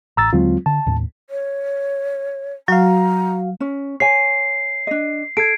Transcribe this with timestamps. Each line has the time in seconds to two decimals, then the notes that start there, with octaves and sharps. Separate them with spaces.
0.17 A1 A#5 E6 A6
0.33 D#2 D3 F#3 G#3 C4 F4
0.66 D3 A5
0.86 D#2 A2
1.30 C#5
2.68 F#3 F#4 F5 A#5
3.60 C#4
4.00 C#5 G#5 C7
4.87 D4 D#5
5.37 A4 G#6 C7 D7